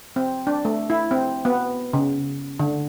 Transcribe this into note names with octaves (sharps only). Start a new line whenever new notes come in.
C4
D4
A3
E4
C4
B3
C#3
D3